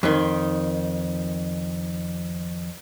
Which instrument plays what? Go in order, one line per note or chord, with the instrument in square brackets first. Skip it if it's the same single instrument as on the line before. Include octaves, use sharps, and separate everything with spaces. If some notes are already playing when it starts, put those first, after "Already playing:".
[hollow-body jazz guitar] F2 D#3